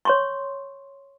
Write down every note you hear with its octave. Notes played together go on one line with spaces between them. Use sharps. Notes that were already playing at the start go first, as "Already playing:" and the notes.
C#5 C6 C#6